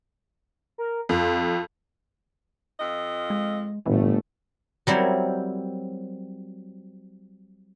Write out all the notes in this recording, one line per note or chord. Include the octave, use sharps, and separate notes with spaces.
A#4
F2 F4
F2 F4 D#5
G#3
G1 A2 E3 A3
F#3 G3 C4 E4 A#4 C#5